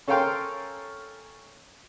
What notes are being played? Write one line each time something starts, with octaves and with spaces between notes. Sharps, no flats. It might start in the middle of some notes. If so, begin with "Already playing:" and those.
C#4 A4 A#4 F5 G5 C6